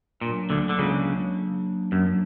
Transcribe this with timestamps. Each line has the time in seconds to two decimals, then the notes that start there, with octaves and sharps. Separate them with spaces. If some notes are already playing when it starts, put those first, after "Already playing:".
0.21 A#2 F#3 A#3 D4
0.50 D2 D3
0.69 D3
0.79 C#2 C#3
1.92 F#2